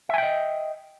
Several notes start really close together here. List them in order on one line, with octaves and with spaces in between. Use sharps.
E5 G#5 G5 D#5